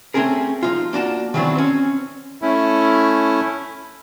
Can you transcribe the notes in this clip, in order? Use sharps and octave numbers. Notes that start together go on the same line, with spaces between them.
A3 C4 C#4 G#4 A#4
F3 D#4 F4
A#3 D4 F#4 A5
D#3 E3 F#3 B3 C4 D4
C4 C#4
A3 C#4 E4